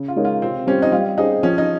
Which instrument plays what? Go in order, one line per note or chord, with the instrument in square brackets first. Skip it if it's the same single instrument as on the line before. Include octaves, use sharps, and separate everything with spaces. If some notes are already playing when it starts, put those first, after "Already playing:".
Already playing: [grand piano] C#3
[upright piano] F4
[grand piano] G#3 D#4 A#4 C#5
[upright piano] F4
[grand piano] C3 [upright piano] C4
[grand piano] G3 C4 G4 C5 [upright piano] C#4
[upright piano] D#4
[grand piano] G3 [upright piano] F4
[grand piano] C#4 G#4 C5 [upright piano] D#4
[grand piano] F3 [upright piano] C#4
[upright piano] D#4